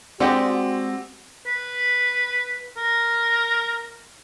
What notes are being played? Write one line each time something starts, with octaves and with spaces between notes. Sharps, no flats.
G#3 C4 D4 F#4 G4 D5 D#5 F#5
B4
A#4